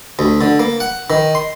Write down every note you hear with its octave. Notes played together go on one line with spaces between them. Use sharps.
D2
D3
A#3
F#5
D#3
C6